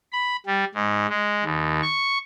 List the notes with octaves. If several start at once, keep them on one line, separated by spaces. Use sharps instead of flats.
B5
G3
G#2
G#3
D#2
C#6